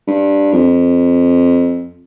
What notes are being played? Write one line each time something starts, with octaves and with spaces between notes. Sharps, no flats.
G2
F2